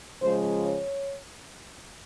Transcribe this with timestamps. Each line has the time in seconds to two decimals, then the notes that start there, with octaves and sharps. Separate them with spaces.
0.21 C#3 F3 G#3 C5
0.65 C#5